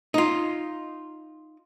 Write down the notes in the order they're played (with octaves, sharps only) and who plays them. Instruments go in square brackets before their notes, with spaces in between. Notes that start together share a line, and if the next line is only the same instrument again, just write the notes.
[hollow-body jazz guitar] D#4 F4